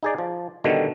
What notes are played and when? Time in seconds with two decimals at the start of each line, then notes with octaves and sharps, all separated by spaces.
0.03 D#4 G#4 D5
0.18 F3
0.64 B2 D3 D#3 G3 A3